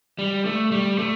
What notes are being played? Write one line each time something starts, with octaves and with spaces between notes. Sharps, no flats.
G3
A3
G3
A3